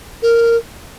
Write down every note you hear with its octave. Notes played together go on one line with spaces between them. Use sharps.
A#4